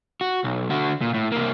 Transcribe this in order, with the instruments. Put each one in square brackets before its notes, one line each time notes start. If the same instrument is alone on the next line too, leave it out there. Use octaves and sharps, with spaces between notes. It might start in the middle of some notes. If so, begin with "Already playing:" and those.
[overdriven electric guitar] F#4
B1
D3 F#4
A#2
A2
C2 A#3